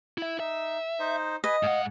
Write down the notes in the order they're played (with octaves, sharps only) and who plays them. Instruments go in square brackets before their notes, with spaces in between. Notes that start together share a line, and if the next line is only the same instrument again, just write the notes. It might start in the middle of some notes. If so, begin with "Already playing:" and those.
[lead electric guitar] E4 E5
[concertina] D#4 [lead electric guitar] E5
[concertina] D#4 C5
[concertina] B4 G#5 [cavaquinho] D#5
[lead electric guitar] G#2 F#5 [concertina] F5